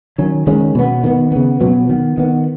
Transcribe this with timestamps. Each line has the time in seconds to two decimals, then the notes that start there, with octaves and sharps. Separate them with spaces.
0.18 D#3 F#3 C#4
0.47 D#3 G#3 C#4
0.75 B2 B3
1.04 D#3 B3
1.32 C#3 B3
1.61 B2 F#3 B3
1.89 D#3 B3
2.18 D#3 B3